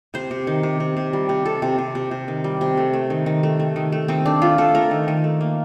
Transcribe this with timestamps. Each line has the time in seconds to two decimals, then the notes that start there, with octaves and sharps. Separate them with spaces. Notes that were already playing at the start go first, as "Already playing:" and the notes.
0.14 C3 C5
0.31 C3
0.47 D#3
0.63 C3
0.80 C3
0.97 C3
1.13 G3
1.29 C3
1.45 C3 A4
1.62 C3
1.78 C3
1.95 C3
2.11 C3
2.28 D#3
2.44 G3
2.61 C3
2.77 A3
2.93 A3
3.10 D#3
3.26 D#3
3.43 A3
3.60 A3
3.76 D#3
3.92 A3
4.08 D#3 C4
4.25 A3 D4
4.42 A3 F4
4.58 A3 A4
4.75 A3 A#4
4.91 D#3
5.08 D#3
5.24 A3
5.41 A#3